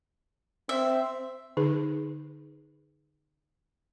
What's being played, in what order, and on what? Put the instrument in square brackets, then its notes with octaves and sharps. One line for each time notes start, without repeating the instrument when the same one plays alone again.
[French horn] C4 [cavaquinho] E5
[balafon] D3 D#4 G#4 B4